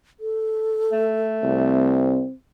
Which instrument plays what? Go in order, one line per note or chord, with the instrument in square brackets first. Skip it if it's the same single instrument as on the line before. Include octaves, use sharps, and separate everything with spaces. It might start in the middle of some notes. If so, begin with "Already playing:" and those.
[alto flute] A4
[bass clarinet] A3
[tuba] C2 [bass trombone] C4